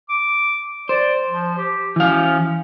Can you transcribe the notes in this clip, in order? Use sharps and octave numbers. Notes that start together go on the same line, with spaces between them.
D6
C5 D5
F3
G4
E3 C#4 F5